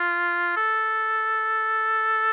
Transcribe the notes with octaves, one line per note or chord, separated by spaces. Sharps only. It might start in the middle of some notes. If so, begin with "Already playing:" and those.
Already playing: F4
A4